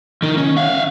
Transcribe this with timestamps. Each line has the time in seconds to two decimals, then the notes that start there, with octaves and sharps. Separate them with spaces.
0.22 D#3 D#4
0.38 C#4
0.57 E5 F5